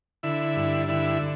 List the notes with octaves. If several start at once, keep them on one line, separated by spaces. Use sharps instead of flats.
D3 E4 E5
G2
D3 E4 E5